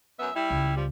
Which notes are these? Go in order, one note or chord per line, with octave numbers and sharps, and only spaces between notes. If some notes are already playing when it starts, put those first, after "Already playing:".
F#2 B3 E5
G3 E4
C#2
F3 G3